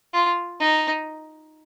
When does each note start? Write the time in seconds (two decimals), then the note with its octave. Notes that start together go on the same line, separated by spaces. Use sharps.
0.14 F4
0.60 D#4